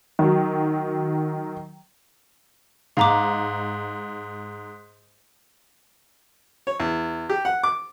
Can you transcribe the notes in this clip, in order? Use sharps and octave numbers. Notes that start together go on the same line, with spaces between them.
D#3 F#3
G#2 F5 A#5 D6
C#5
E2
G4
F#5
D6